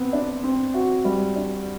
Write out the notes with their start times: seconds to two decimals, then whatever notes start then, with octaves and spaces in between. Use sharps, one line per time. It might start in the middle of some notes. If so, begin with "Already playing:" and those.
Already playing: B3 C4
0.13 D4
0.44 C4
0.74 F#4
1.05 G3
1.36 D4